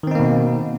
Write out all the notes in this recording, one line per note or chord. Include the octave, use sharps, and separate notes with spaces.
B2 D#3 A#3 C4 D#4